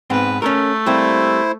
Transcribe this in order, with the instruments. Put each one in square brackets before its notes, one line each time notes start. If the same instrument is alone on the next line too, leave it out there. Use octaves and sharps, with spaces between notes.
[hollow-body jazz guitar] G#2 B3 C4 [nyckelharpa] B4
[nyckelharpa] A3 [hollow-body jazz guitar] C#4 A4 A#4
[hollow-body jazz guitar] G3 A#3 C4 [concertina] E4 C5